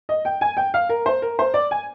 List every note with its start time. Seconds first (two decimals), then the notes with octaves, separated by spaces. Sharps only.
0.09 D#5
0.25 G5
0.41 G#5
0.57 G5
0.74 F5
0.89 A#4
1.06 C5
1.22 A#4
1.39 C5
1.54 D5
1.71 G#5